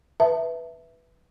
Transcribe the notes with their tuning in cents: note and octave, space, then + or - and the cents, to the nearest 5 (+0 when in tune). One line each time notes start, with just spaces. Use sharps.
B4 +0 E5 +0 A5 +20